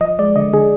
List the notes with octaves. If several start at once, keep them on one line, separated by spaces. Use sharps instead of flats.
F3 D#5
G#3 D5
D3 D#5
D3 G#4